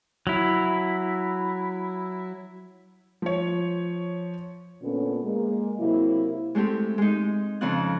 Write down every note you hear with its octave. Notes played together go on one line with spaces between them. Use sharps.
F#3 E4
F3 C#5
A#2 D3 A3 B3 C#4
G#3 A#3
C3 F#3 A#3 E4
G#3 A3 C4 G4
G#3 D#4
F2 C#3 F3 C4 F4 F#6